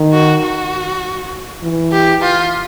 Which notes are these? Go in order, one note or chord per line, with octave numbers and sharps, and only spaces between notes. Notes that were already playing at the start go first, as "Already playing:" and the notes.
Already playing: D#3
F#4
F#4
E3
G4
F4